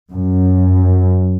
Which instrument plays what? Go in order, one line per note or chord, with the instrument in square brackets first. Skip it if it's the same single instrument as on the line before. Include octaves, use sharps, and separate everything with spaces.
[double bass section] F#2